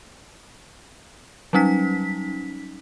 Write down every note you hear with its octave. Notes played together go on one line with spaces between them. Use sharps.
F#3 G3 C#4 D#4 B6